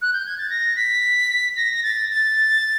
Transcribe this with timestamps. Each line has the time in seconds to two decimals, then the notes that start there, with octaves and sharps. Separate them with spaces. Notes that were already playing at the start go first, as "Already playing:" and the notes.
0.02 F#6
0.13 G6
0.26 G#6
0.38 A6
0.50 A#6
0.76 B6
1.57 A#6
1.74 A#6
1.83 A6
2.10 A6